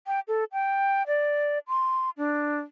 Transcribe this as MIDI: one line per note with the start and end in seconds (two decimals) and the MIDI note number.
0.07 0.20 79
0.28 0.44 69
0.52 1.03 79
1.07 1.58 74
1.68 2.10 84
2.18 2.59 62